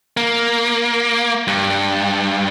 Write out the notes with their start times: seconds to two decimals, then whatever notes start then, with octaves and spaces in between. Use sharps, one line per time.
0.17 A#3
1.47 G2